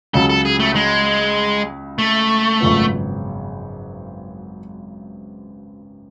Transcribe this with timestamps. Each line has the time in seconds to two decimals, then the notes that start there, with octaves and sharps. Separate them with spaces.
0.14 C#2 C#3 F#3 A4
0.29 A4
0.45 G#4
0.59 A3
0.75 G#3
1.99 A3
2.61 G#1 F#2 C#3 F3 B3